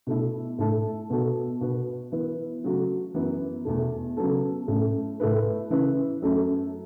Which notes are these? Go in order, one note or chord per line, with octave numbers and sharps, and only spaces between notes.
B2 A3 E4
A2 A3 E4 A4
B2 B3 F#4 A4
B2 B3 F#4 B4
E3 B3 E4 B4
C#3 F#3 A3 F#4
F#2 E3 B3
E2 B2 A3
C#3 F#3 B3 A4
A2 A3 C#4
A2 A3 E4 B4
C#3 E3 C#4 E4 B4
F#2 F#3 A3 C#4